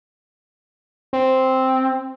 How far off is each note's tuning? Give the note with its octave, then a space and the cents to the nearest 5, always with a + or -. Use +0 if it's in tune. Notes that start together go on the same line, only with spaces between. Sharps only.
C4 +0